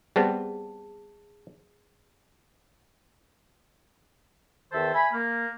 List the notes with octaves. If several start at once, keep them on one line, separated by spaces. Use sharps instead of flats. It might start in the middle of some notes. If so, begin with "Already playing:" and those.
G3 B3 C4 G#4 A5
E2 D#3 A4 C5 E5
E5 G#5 B5
A#3